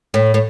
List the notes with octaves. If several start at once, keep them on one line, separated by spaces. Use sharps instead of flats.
A2
A2